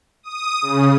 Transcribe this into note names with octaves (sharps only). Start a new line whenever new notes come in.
D#6
C#3